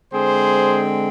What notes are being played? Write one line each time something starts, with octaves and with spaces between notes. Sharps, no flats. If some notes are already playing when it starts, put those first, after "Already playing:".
D3 G#3 C4 G#4 C5